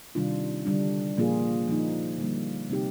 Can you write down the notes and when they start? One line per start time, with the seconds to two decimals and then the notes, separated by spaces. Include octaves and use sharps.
0.15 C3 D#3 G3 D4 F4
0.66 D3 G3 D4
1.17 A#2 F3 A#3 F4 G#4
1.68 F3 A#3 D#4
2.18 D3 G3 A#3
2.69 C3 G3 C4 D#4 G4